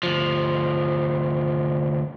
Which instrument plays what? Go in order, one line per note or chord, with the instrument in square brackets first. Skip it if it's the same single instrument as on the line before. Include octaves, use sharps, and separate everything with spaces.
[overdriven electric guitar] D2 F3